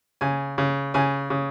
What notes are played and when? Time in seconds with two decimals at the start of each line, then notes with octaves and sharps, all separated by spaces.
0.21 C#3 G#5
0.58 C#3
0.94 C#3 G#5
1.30 C#3